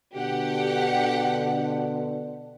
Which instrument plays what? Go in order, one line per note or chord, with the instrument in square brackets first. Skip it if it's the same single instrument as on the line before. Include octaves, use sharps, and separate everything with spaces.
[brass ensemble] B2 D3 [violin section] G4 F#5